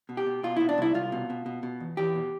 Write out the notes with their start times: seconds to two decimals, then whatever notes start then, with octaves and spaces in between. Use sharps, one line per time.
0.09 B2
0.17 G4
0.26 B2
0.43 B2 F4
0.56 B2 E4
0.69 D4
0.78 C2 E4
0.94 C2 F4
1.12 B2
1.30 B2
1.46 B2
1.63 B2
1.80 E2
1.97 E2 G4
2.15 B2